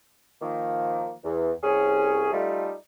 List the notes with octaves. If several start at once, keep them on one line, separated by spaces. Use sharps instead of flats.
D#3 F3 A#3
E2
C2 C#4 G#4
G3 A3 D#4 F4